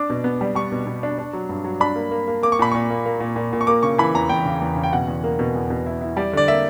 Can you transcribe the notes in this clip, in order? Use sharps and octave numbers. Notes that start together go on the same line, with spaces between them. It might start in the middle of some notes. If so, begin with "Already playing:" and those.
Already playing: D4 D6
B2
B3
G3
G3 C#6
B2
B2
D4
D4
F#3
G2
F#3
D4 B5
A#3
A#3
A#3
A#3 D6
C#6
A#2 B5
A#2 C#6
A#3
A#3
A#2
A#2
A#2
C#6
A#3 D6
C#3 C#6
E3 B5
E2 A#5
E2 G5
C#3
E2
C#3
G5
B2 F#5
E2
A#3
B2
E2
B2
E4
E4
G3 D5
D3 D5
A#3 E5